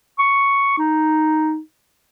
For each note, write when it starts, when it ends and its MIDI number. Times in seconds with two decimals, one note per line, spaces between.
0.19 0.73 85
0.78 1.59 63